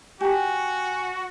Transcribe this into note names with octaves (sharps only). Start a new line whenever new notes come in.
F#4 G4 G#5 A#5